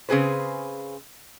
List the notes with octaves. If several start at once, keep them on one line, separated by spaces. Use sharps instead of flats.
C#3 C4 G#4 B4 C5